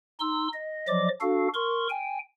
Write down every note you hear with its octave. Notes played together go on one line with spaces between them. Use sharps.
D#4 C6 E6
D#5
F3 F#3 D5 D#5 D6
D4 F#4 A4 F5
A#4 C6 C#6
G5 G#5